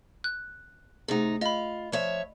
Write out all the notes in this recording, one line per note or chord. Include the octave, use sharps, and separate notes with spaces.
F#6
C3 A3 D#4 G#4
F4 D#5 B5
F3 C#5 D5 E5